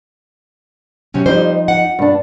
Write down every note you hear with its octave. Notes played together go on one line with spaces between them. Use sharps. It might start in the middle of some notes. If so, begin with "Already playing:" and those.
C3 F#3 C#4
F2 G3 D#4 C5
F#5
G2 D4